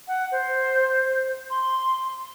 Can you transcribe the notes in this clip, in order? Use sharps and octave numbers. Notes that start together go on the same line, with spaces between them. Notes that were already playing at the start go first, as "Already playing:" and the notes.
F#5
C5
C6